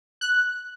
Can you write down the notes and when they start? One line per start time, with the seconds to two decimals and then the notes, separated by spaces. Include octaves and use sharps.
0.21 F#6